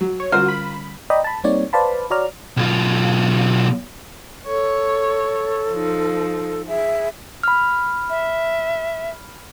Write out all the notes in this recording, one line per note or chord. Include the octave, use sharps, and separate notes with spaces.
F#3
C#5
D3 G3 C#4 F4 F#4 A#4 C5 F6
B5
D5 D#5 G5 A#5 B5 D#6
A5 B5
G3 A#3 C4 D#4 C#5 D5
B4 C5 D5 F5 A5 B5
F#4 C#5 D5 A#5 F6
B1 F4
A4 C#5
F3 D#4
G#4 E5
B5 F6
E5